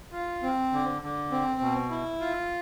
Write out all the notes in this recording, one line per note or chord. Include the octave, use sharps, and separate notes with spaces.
F4
C4
D3
D3
C4
B2
E4
F4